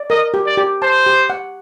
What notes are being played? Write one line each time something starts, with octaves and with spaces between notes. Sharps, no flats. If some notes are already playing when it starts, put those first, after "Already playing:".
Already playing: D5
A#4 D#5
G4
D5
G4
C5 A5
G4
F#5